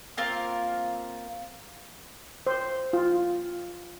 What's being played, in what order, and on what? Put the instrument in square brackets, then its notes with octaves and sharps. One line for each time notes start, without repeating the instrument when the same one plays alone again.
[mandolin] A#3 C4 F4 A#4
[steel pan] C5
F4